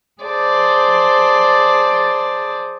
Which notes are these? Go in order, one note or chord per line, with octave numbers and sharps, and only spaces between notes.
G#4 C5 D5 A5